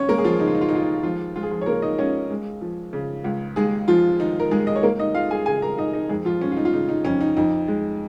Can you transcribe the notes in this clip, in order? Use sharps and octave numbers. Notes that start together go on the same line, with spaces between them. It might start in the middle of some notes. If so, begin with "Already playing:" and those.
Already playing: D#2 C#4 C#5
G#3 A#3 A#4
G#4
F3 F4
C#3 D#4
F4
D#4
F4
D#4
D#2 F4
D#4
C#2 F3 F4
G#3 F4
G#4
F3 F4
C#5
C#3 A#3 A#4
D#4 D#5
C#2 C#4 C#5
G#3
F3
C#3
C#2
D#2 G#3 G#4
F3 G#3 F4
D#3 D#4
A#4
D#2 G#3 G#4
D#5
C#5
C#2 A#3 A#4
D#4 D#5
G#3 F4 F5
G#4 G#5
C#3 G#4 G#5
A#4 A#5
C#2 D#4 D#5
D#4 D#5
F2 G#3 G#4
F3 F4
G#3 C#4
F4
D#4
F4
C#3 D#4
D#4
F2 C#4
D#4
F2 D#4
G#3